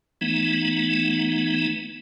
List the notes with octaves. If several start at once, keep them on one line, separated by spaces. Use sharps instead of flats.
E3 A3 B3 D#4